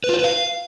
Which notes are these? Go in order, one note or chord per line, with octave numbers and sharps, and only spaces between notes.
B4
F4
C5
B4
F5